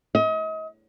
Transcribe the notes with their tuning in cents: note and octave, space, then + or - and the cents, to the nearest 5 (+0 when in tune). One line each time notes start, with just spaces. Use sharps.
D#5 +35